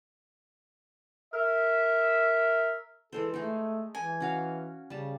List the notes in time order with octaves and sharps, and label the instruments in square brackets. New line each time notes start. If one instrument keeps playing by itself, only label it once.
[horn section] A#4 E5
[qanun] E3 G#3 C5 [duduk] A4
[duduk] A3 [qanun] D#4 G#4
[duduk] E3 [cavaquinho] G#5
[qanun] C#4 F#4 F5
[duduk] C#3 [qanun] G3 A5